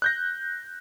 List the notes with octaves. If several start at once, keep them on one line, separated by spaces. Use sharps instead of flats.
F#6 G6 A#6